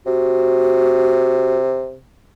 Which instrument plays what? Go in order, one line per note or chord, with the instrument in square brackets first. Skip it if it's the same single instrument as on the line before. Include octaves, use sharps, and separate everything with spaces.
[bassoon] C3 [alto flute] F#4